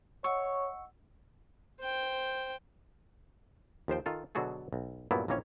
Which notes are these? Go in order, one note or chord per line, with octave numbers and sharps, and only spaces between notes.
C#5 D#5 F#5 C#6 E6
C5 G5
D#2 F3 C5 G5
D#3 F4 A4
B2 D3 F#3 F#4 G#4 A4
B1
G2 A#2 F#3 A#3 B3 E4
A#1 D#3 E3 A#3 C#4 C#5